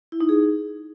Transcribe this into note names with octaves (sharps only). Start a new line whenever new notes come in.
E4
D#4
G#4